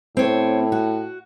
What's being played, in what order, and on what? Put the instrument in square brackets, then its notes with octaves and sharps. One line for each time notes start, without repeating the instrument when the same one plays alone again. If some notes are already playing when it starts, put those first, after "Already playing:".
[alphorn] A2 [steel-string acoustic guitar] C4 C#5
[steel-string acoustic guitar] F#4